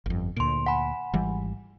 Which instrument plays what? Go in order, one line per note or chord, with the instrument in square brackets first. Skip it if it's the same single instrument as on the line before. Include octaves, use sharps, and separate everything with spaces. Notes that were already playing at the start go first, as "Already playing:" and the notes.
[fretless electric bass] G1 F2
[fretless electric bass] D2 A#2 [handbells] C6 D7
[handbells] F#5 G#5 B5
[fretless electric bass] G#1 E3 G3